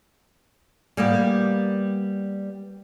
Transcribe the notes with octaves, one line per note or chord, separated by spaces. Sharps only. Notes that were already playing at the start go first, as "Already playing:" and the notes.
G3 A#3 B3 G4